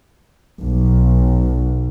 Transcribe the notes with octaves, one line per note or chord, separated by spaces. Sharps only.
B1